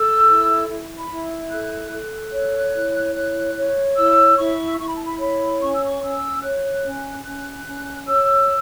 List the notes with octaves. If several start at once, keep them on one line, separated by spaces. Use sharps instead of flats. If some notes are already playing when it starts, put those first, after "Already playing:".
Already playing: A4 E6
E4
E4
B5
E4
A4 F#6
A4 F#6
C#5
E4
C#5
C#5
E4 E6
E4 C#6
E4 C#6
B5
A5
B5
C#5 B5
C#4 C#6
E6
C#6
C#4 E6
C#5 F#6
C#4
C#4 F#6
C#4
C#5 E6